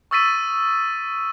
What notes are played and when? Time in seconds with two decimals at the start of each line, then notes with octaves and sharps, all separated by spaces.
0.11 C#6 D#6 E6 A6 B6 D#7